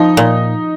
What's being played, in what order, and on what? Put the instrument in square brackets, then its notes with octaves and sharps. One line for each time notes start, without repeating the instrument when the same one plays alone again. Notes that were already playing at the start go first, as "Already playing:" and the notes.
Already playing: [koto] F3 [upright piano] D#4
[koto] A#2